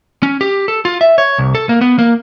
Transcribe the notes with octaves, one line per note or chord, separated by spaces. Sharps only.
C#4
G4
A4
F4
E5
C#5
C2
A4
A#3
B3
A#3